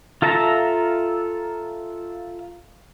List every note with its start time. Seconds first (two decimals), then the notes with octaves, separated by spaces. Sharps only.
0.22 F4 A4 E5 A5 A#5